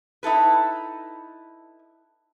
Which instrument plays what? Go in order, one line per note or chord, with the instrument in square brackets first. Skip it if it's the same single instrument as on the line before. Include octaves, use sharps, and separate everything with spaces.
[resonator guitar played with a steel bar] D#4 E4 A4 B4